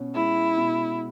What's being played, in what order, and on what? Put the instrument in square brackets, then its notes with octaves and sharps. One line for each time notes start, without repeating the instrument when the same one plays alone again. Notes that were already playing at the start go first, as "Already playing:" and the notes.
Already playing: [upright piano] B2 C#4
[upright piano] G#3 [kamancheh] E4
[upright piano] B2